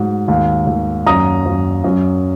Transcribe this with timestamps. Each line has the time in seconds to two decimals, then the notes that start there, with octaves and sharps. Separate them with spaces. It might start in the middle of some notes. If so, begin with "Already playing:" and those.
Already playing: G#2 F#3
0.28 D#2
0.67 D#2
1.06 F#2 A#5 D#6
1.46 F#2
1.84 F#2